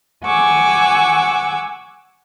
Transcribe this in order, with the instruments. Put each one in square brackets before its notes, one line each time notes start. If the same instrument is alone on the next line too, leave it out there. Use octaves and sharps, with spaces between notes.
[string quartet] F#5 G#5 C#6 D6 E6